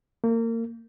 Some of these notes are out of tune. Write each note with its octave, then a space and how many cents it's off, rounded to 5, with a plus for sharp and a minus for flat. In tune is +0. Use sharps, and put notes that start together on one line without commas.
A#3 -30